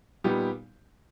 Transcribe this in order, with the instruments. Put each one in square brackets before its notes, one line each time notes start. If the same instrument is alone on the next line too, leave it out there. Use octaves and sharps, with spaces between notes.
[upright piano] A#2 G3 B3 D#4 G4